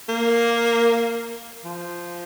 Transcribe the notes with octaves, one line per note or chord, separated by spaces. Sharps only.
A#3
F3